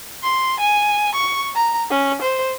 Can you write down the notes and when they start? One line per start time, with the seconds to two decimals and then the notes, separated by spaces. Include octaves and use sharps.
0.23 C6
0.60 G#5
1.15 C#6
1.56 A#5
1.91 C#4
2.22 C5